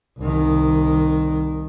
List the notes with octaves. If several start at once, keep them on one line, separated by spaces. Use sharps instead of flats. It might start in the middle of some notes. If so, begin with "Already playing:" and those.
C2 D#3